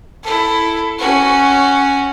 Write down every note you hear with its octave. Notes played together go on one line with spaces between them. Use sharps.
E4 A4
C#4 F#4